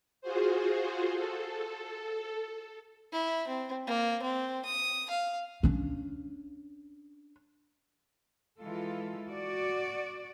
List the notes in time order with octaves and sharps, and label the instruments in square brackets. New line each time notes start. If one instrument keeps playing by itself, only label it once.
[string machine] F4 F#4 G#4 C5
A4
[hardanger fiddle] E4
C4
A#3
C4
D#6
F5
[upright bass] C#4 D4
[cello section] E3 G#3 F4 A4
F#4 D5